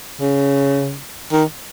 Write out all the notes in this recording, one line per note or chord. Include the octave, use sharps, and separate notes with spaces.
C#3
D#3